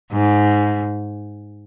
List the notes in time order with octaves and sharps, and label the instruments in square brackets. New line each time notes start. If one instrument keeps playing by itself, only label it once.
[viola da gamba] G#2